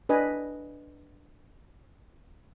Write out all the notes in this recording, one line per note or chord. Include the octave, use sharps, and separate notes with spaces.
D4 B4 D#5 G#5